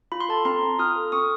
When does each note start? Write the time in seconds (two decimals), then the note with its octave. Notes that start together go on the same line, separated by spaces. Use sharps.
0.12 F4 B5
0.20 C6
0.29 A4 A5 B5
0.45 C4 A#5 C6
0.63 C4
0.79 F4 D#6 F6
0.96 A4
1.12 C4 C#6 D#6